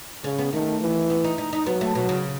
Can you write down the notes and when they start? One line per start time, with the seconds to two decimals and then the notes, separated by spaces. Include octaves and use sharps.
0.24 C#3 C#4
0.38 B3
0.53 D#3 A3
0.81 E3
1.10 B3
1.24 D#4
1.38 D#4
1.53 D#4
1.66 F#3 B3
1.81 A3
1.95 B2 F#3
2.09 C#3